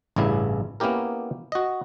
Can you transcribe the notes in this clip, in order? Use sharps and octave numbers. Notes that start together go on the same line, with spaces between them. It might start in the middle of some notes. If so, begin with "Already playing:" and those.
A1 G2 C#3 E4
A#3 B3 C#4 E4 G4 A#4
F#4 D#5